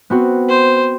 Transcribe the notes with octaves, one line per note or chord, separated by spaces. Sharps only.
B3 C4 F#4
C5